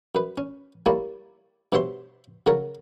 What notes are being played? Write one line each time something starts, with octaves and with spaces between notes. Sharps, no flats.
F#2 B4
C#4
G3 A#3 E4 C#5 D5
G2 B2 C5 C#5 E5 C6
C#3 F#3 A4 A#4 C#5